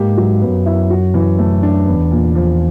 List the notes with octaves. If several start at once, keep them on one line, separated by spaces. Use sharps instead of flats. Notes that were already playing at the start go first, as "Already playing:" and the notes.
Already playing: G#2 G#3 A#3 G4
F#3
F#2 F#3 B3
E4
F#4
E3
A3
D4
E2 E3 B3
A#2
F3